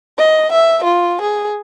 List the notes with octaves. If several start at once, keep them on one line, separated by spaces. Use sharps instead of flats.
D#5
E5
F4
G#4